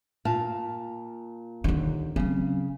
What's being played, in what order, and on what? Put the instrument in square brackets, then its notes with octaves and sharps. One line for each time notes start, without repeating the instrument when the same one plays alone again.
[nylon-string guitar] A#2 F5 A5
[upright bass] D#2 D3
[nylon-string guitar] C#3 [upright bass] F#3 C4